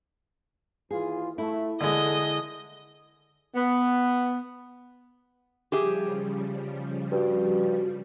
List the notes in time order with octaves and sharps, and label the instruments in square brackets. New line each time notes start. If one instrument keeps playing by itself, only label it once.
[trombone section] D#2 E3 F4 [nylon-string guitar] G#4
[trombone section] A3 [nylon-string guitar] E4
[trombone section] C2 E3 A4 [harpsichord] D3 G#3 [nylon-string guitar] A#3 E4 [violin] D#5
[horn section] B3
[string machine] C#3 F3 G3 [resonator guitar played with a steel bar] G4 G#4 E5
[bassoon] G2 [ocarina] F#4